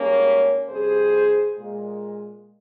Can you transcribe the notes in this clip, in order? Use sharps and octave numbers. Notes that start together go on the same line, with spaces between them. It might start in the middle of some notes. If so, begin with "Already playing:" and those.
Already playing: G#2 G3 A#3 C#4
F2 C3 G3 G#4 C5
A#2 G#3